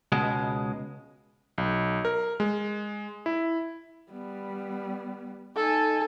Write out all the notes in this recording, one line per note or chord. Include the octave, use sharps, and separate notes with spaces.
C#2 B2 G#3
B1
A#4
G#3
E4
G3 B3
D#4 A4 G#5